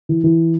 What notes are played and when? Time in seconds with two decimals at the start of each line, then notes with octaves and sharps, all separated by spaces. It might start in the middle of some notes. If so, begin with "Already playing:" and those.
0.09 E3
0.24 E3